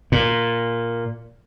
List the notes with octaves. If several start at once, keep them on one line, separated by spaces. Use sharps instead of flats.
A#2